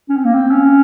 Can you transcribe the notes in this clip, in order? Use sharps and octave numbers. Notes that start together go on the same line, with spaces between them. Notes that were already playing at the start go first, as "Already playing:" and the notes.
C#4
C4
A#3
C4
C#4